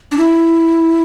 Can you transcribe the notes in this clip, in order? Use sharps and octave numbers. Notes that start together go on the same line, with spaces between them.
D4
E4